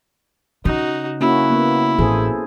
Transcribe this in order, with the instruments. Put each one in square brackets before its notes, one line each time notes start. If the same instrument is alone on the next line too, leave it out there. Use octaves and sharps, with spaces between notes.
[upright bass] C#3 [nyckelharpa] D#4 F#4
[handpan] A#3 C#4 F#4 [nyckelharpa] E4
[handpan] A#3 B3
[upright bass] A1 [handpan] G#4 A4 C5